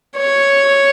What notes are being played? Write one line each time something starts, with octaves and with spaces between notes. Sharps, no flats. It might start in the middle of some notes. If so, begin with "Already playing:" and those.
C#5